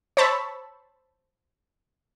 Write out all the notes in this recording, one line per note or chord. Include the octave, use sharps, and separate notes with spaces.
C5 C#5 A5 B5 C#6 E6